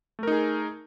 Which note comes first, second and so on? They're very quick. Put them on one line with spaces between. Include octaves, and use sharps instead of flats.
A3 A#4 D#4 G#4